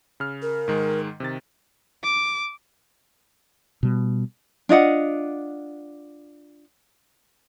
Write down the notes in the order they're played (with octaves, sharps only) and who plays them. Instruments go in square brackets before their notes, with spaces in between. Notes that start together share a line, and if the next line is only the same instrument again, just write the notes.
[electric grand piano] C#3 F6
[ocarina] A#4
[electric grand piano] G#2 D#3 G#3
C3 D#3 A6
[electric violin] D6
[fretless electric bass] B2 G3
[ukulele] D4 F4 D#5 F#5